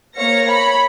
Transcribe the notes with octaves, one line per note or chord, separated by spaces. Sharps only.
A#3 C5 C#5 F5 A#6 C#7
C#5 B5 C#7